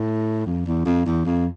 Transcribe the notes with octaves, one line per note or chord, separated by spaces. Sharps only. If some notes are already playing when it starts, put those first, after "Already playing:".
Already playing: A2
F2
E2
F2
E2
F2